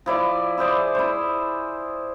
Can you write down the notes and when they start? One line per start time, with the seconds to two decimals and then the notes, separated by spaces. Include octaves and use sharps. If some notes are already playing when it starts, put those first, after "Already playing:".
0.06 F3 E4 D5
0.58 E4 G#4 C5 D5
0.95 E4 C5